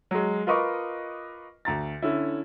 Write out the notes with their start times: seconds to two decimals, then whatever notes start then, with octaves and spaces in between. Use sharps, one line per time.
0.11 F#3 G#3
0.47 F4 A#4 B4 D#5 C#6 D6
1.65 D2 A#5 A6
2.02 D3 C#4 E4